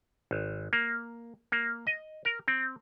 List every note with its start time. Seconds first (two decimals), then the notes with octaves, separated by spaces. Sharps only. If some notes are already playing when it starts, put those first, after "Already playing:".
0.31 G#1
0.73 A#3
1.52 A#3
1.87 D#5
2.25 A#4
2.48 C4